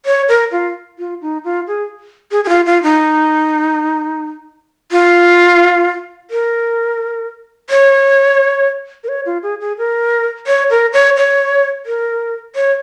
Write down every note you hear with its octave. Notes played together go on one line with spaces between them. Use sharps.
C#5
A#4
F4
F4
D#4
F4
G#4
G#4
G#4
F4
F4
D#4
F4
A#4
C#5
A#4
C#5
F4
G#4
G#4
A#4
C#5
A#4
C#5
C#5
A#4
C#5